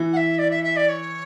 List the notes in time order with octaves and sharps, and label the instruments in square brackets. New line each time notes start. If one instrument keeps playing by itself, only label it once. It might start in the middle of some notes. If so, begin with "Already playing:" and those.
Already playing: [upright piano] E3
[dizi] F#5
E5
D5
E5
E5
D5
C#5